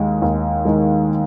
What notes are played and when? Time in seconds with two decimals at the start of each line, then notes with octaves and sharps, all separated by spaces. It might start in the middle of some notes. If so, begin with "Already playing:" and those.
Already playing: D#2 D#3 G#3
0.22 D#2
0.65 D#3 G#3